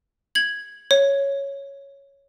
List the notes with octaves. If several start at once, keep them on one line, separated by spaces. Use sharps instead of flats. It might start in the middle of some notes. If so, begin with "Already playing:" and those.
G#6 F#7
C#5